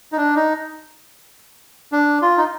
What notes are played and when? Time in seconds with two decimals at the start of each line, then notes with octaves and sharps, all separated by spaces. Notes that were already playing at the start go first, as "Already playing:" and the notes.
0.12 D#4
0.17 D4
0.36 D#4
1.92 D4
2.22 F4
2.37 D#4